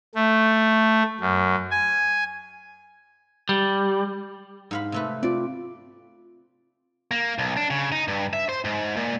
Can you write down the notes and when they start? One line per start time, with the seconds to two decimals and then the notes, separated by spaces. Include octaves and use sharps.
0.15 A3
1.20 F#2
1.71 G#5
3.49 G3
4.71 G#2 F5 B5
4.92 C3 A3 B4
5.23 C4 F4 D5
7.11 A#3
7.38 B1
7.57 D4
7.71 C#3
7.92 D#4
8.08 G2
8.33 E5
8.49 C5
8.65 G#2
8.96 A#2